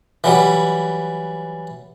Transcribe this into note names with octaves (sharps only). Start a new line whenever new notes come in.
E3 F#3 G3